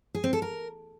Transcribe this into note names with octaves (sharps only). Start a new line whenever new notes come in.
G#4
C4
A4
A#4